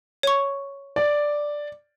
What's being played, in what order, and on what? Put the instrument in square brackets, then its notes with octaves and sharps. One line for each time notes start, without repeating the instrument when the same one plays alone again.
[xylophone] C#5 C#6
[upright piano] D5